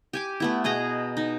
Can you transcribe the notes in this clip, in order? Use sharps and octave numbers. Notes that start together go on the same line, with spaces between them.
G4 G#5 D6
A3 B3 E4
B2 G#4 D#5 A#5
D#4